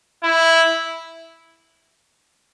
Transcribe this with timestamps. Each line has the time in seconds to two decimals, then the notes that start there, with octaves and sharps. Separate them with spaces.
0.23 E4